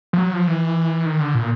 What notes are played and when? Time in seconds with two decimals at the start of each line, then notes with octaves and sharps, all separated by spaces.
0.13 F3
0.18 F#3
0.33 F3
0.48 E3
1.06 D#3
1.20 D3
1.35 A#2